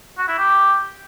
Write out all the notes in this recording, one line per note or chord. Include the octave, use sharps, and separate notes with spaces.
F#4
E4
G4